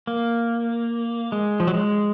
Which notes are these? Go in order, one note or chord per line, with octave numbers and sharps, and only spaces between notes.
A#3
G#3
F3
F#3
G#3